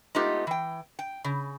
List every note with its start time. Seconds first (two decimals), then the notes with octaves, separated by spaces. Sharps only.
0.15 G#3 A3 B3 D#4 F4 G4
0.47 E3 G5
0.99 G5
1.24 C#3